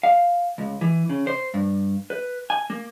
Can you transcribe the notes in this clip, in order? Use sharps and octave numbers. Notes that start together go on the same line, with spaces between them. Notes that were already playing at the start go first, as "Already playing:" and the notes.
F5
C#2
E3
C#3
C5
G2
B4
G#5
A#3